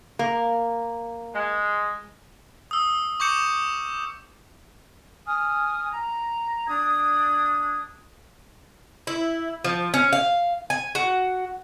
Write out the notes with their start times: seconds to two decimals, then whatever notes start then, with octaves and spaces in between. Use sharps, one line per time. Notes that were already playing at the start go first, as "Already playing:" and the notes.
0.19 A#3
1.35 G#3
2.71 D#6 E6
3.20 C#6 D6 G6 C#7 E7
5.27 G#5 D#6 F6
5.90 A#5
6.68 D4 D#6 G#6
9.07 E4
9.64 F3
9.94 C#4
10.13 F5
10.70 G#5
10.95 F#4